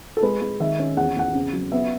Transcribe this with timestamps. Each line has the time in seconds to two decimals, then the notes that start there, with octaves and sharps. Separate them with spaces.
0.17 A4
0.22 G#3 B4
0.42 G#3
0.60 D#3 E5
0.79 C#4
0.97 E2 F#5
1.17 E2 F#5
1.35 C#3
1.53 F#3
1.72 B3 E5